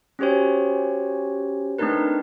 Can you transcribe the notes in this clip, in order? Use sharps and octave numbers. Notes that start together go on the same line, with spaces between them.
C#4 F#4 G4 C5 C#5
A3 C4 D4 D#4 A#4 B4